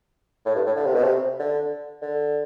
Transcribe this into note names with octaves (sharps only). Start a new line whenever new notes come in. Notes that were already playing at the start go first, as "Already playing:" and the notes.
A2
G2
A2
D3
C3
B2
C3
D3
D3